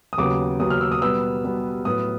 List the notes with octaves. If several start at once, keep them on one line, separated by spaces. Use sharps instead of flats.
D#6
D#2 C#3 F#3 B3 D6
D#2 C#3 F#3 B3 D#6
F6
E6
D#6
B2 G3 B3 E6
B2 G3 B3
A2 F#3 B3 D#6